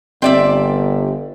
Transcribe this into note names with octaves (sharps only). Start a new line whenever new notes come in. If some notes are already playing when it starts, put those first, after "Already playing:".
G1 C4 D5 E5